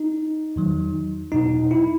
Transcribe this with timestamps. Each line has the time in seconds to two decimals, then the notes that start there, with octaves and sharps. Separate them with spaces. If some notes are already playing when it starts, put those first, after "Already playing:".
Already playing: D#4
0.56 E2 D#3 F#3
1.32 E2 B2 F#3 D#4
1.71 E4